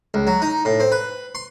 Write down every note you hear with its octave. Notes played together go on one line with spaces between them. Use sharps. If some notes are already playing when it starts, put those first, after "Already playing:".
C#2
F#3
D#4
A2
C4
B4
C6